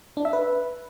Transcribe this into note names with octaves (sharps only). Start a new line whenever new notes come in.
D4
E5
B4